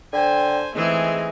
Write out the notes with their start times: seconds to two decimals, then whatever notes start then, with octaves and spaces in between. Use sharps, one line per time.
0.13 D3 C5 G5 G#5
0.75 E3 G#3 A3 C4 D#4 G#4